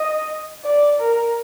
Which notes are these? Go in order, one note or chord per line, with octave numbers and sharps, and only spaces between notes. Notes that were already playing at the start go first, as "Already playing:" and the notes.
Already playing: D#5
D5
A#4